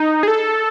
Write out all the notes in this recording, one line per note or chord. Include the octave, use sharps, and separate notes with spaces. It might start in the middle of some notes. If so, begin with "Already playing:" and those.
Already playing: D#4
G#4
A4